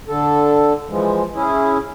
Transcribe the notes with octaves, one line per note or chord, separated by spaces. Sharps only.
D3 A4
E3 F3 G#3
C#4 E4 G#4